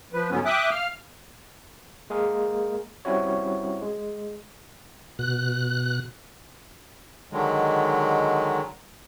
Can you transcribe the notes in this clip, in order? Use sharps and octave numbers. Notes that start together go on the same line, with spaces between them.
F3 B4
G#2 D3 F#3 B3 C#4
E5 G5 D6 D#6 F#6
F5 F6
G#3 A#3 G#4 A#4
G3 C4 C#4 E4 F#4 C#5
G#3
B2 F#6
D3 D#3 F#3 G#3